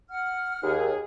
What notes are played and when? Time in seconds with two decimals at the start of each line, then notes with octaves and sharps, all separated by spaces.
0.11 F#5 F6
0.63 D#2 G#4